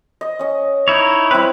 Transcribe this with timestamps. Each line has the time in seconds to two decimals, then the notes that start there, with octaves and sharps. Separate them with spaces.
0.21 D#5
0.39 C#4 D#5
0.88 D#4 E4 C#5
1.31 G3 C4 E4 B4